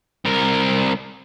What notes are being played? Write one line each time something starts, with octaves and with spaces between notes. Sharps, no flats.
C2 A#4